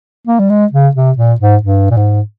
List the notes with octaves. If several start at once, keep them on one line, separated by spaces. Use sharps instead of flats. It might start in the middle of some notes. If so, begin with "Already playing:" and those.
A#3
G3
G#3
C#3
C3
A#2
G#2
G2
A#2
G#2